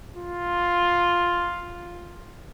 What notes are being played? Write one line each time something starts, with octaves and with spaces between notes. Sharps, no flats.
F4